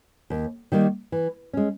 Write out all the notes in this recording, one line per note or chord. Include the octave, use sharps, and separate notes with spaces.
D#2
D#3 G3 A#3 D#4
E3
G#3 C#4